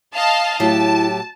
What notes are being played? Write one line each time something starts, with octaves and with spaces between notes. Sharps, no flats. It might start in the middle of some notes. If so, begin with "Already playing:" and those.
D#5 F5 A5
A2 F#3 E4 G4 A5